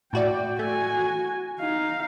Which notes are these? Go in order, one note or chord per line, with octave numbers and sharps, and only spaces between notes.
A2 F#4 D5 G5
A3 F#4 G#5
D#4 F5